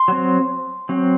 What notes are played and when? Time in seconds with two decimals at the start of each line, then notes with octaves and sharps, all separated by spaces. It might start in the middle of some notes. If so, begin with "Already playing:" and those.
Already playing: C6
0.08 F#3 C4
0.89 F#3 C4